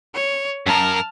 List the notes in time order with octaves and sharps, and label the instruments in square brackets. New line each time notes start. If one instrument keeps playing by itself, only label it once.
[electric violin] C#5
[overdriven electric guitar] F#2 A#4 [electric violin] A5 F6